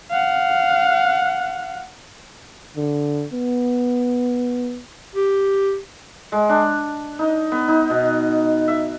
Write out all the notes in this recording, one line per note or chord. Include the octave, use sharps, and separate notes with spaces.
F5 F#5
D3
B3
G4
G#3
D4
D#4
B3
D#4
B2
E5